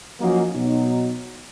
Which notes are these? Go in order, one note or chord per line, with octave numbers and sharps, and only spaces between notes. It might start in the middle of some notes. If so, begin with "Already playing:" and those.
F3 F#3 A#3 C#4 D#4 F#4
B2 F#3 D#4